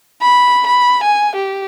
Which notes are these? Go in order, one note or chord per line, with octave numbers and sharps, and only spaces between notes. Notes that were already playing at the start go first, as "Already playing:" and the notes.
B5
B5
G#5
G4